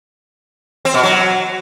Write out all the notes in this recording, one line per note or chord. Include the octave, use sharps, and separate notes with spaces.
C4
B2
F#3